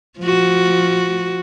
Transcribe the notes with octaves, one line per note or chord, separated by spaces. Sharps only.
F3 F#4